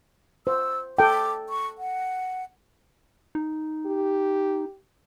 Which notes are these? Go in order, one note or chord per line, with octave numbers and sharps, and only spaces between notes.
C5 E6
A4 G5 D6
C#6
F#5
D#4
G4